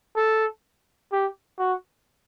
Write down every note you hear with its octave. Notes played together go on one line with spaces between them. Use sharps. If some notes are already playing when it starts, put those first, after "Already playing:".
A4
G4
F#4